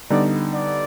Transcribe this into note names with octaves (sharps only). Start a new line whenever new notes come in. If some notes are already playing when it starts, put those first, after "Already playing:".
D3 G3 B3 D#4 D5
D5